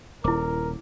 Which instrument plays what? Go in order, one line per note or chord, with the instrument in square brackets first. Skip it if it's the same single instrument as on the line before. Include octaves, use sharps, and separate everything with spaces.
[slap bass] D#1 [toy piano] E4 D6 [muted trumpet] A#4